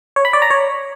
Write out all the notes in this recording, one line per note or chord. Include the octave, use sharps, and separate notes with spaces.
C#5
B5
D5
A#5
C#5